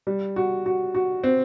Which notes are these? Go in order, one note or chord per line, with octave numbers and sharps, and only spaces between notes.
G3
F#4
F#4
F#4
C4